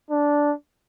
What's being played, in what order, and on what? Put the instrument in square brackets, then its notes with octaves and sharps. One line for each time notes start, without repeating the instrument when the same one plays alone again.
[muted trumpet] D4